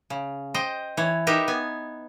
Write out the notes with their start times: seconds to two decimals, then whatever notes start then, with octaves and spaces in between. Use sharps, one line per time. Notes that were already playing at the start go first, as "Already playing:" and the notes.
0.10 C#3
0.54 C5 D#5 G5
0.97 E3 C#5
1.27 D#4 G4 A#4 B4 E5
1.48 B3 G#5